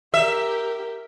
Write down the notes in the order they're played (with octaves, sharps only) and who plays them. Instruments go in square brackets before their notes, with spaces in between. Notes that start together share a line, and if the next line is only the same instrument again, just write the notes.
[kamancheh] G4 A#4 [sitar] E5